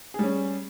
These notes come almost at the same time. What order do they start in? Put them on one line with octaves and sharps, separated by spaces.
G#4 G3 C#4